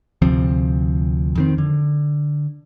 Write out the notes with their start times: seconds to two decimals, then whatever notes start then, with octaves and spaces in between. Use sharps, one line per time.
0.22 D2 C3 F3 C4
1.35 F2 D#3 C4
1.58 D3